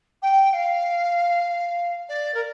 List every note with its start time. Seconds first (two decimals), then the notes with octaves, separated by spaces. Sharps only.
0.22 G5
0.53 F5
2.08 D5
2.34 A#4